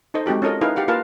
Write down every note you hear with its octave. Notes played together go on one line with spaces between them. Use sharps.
D#4 A4 C5 D#5
G#3 C4 F#4 G4 A4
C#4 F4 A4 A#4 D#5
D#4 E4 G#4 A#4 B4 F5
G4 F5 F#5
A#3 F4 A#4 B4 F5 A5